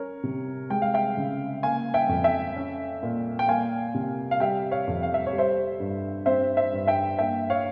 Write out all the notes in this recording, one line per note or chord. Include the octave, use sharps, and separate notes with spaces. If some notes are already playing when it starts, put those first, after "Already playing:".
Already playing: C#4 A#4 C#5
C3
G#3 G5
F5
E5 G5
C#3
A#3 F5 G#5
E5 G5
F2
E5 G5
C#4
A#2
G5
A#3 F5 G#5
C3
F5
G3 E5 G5
C#5 F5
F2
F5
E5
C#5
G3
C5 E5
G2
C4 C5 E5
C5 E5
G2
E5 G5
A#3 E5 G5
C#5 F5